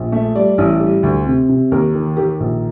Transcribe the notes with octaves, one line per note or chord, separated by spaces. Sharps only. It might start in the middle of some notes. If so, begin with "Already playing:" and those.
Already playing: A#1
A3
G3 D5
A1
G3
D2
C3
C3
D#2 A#4
D#3
D#3 G4
A#1